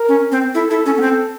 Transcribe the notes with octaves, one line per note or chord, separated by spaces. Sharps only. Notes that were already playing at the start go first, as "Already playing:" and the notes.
Already playing: A#4
C#4
C4
E4 A4
E4 A4
C#4 A4
B3
C4